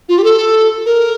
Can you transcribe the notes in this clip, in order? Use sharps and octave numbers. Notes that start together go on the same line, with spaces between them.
F4
G4
A4
A#4